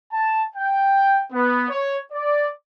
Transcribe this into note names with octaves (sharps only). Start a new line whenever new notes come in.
A5
G5
B3
C#5
D5